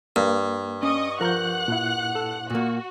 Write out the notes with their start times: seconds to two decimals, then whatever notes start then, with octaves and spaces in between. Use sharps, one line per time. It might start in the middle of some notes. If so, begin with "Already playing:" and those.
0.16 G2 A#3
0.83 C#4 D#5 C#6 D#6
1.21 F3 A#4 F#5 A#5 C#6 F#6 G6
1.68 A#2 E4
2.15 A4
2.50 A#2 A#3 F#4